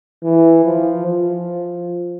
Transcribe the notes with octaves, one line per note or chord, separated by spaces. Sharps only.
E3
F3
F3